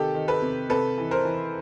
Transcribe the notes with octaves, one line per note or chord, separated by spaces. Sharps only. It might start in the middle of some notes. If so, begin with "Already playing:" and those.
Already playing: C3 D#3 G4 A4
D#3
A4 B4
C3
C3 A4 B4
E3
A#4 C5
E3